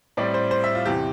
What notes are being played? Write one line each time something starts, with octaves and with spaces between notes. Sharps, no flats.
A2 G3 C4 D5
C5
C5
E5
F4
E2 C3 E3 G4